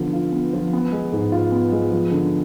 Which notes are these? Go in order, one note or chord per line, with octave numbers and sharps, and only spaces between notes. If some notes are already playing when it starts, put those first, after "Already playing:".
Already playing: D3 F3 B3
F4
B3
F3
B3
G#3
G#2
F4
B3
G#3
F3
D3